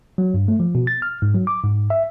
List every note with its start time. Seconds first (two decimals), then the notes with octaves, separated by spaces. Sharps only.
0.18 F#3
0.34 G2
0.48 A3
0.60 F3
0.75 B2
0.87 A6
1.02 F6
1.22 G#2
1.34 F#3
1.47 D6
1.64 G#2
1.90 E5